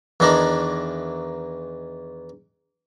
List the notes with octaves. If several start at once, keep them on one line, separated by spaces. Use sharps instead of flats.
E2 D#3 E3 D4 D#4